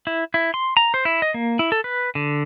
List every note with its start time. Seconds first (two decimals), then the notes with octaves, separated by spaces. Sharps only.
0.07 E4
0.34 E4
0.54 C6
0.77 A#5
0.94 C5
1.05 E4
1.22 D#5
1.34 A#3
1.59 E4
1.72 A4
1.84 B4
2.15 D3